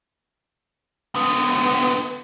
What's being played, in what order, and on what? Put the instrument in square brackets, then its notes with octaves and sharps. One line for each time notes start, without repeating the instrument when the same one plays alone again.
[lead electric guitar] D3 B3